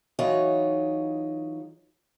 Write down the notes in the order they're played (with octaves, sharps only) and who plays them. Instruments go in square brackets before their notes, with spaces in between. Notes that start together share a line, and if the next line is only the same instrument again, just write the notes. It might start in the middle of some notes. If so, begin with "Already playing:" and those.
[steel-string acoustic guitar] E3 F#3 D#4 F4 G#4 C#5